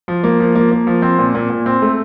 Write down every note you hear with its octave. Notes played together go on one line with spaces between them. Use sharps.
F3
A#3
F3
A#3
A#3
F3
C4
A#2
A#2
A#2
C4
A3